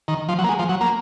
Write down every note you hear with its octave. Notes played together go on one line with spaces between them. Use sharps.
D#3
F3
F#3
A#3
G#3
F3
F#3
A#3